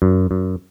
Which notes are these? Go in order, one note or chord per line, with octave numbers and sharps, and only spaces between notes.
F#2
F#2